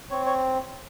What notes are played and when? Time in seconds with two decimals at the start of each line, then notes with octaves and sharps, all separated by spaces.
0.10 C4 C#5
0.26 C#5